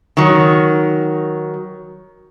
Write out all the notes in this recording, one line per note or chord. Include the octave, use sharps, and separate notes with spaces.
D#3 F#3